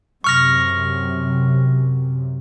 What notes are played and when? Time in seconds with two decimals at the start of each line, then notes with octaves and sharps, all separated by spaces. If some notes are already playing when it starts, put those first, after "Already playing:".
0.24 F#2 C3 C#6 F6 A#6